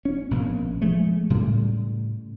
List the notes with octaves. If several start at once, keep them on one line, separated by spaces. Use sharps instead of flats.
C#4
A#1 B2 A#3
F3 G#3 A3
A2 C#3 G3